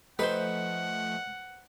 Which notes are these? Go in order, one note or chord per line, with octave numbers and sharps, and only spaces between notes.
F3 A3 D#4 A4 B4 C5 F#5 G5